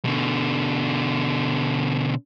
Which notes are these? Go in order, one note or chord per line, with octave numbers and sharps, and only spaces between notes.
B2 D3